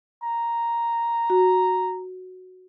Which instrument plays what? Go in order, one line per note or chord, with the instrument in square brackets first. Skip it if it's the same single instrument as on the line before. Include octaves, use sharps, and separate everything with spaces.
[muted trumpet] A#5
[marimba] F#4